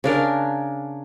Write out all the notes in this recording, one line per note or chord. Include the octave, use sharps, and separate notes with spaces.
C#3 D4 A#4